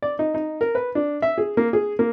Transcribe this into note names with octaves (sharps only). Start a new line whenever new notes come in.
D5
D#4
D#4
A#4
B4
D4
E5
G#4
A#3
G#4
A#3